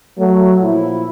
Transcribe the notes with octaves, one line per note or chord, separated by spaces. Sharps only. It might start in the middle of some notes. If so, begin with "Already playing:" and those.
F#3 A3
A#2 F3 E4